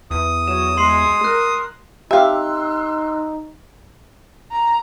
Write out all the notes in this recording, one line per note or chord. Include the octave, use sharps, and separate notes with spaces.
E2 D#6
F#3 E7
G#3 C6 C7 F#7
A#4 F#6
D#4 G4 E5 F5 C6 E6 F#6
A#5